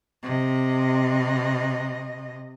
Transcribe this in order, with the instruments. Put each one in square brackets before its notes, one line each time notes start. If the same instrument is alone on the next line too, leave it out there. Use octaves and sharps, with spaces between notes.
[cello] C3 D#5